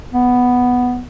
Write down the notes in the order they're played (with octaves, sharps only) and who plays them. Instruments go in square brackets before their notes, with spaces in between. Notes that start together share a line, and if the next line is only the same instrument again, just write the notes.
[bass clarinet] B3